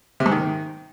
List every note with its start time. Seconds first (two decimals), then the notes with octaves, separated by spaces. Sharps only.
0.20 C3
0.26 G#2
0.31 D#3